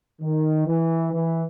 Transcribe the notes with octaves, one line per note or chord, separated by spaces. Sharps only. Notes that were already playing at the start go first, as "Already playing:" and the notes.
D#3
E3
E3